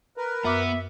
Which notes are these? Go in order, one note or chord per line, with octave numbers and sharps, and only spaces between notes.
A#4 B4
F#2 B3 E5 D6